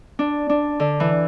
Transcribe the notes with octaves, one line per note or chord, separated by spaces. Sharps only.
D4
D4
D3
E3